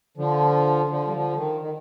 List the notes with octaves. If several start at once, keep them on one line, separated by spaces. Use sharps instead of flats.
D3 F3
D3 F3
G3
D3 F3
D#3
D#3